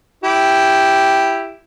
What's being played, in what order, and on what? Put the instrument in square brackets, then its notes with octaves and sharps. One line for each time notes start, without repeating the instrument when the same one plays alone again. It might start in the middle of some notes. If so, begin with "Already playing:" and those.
[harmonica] E4 G4